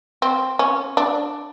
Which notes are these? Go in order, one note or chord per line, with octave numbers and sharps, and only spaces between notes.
C4
C#4
D4